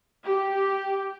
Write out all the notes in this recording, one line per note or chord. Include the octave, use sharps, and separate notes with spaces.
G4